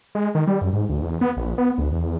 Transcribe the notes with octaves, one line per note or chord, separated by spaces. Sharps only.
G#3
D#3
G3
F#2
G#2
D2
E2
B3
A#1
B3
D2
E2